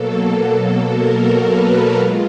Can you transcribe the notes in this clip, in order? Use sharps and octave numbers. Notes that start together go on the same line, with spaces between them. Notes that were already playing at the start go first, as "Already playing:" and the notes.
Already playing: B2 F#3 A#3 A4
A#4
B4
G#3 F4